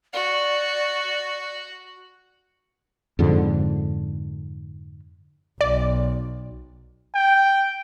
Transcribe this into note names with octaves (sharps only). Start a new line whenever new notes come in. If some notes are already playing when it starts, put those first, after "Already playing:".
F#4 D5
F2 G#2 D3
B1 D5
G5